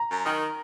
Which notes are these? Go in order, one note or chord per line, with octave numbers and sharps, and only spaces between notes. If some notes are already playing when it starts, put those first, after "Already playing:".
Already playing: A#5
F#2
D#3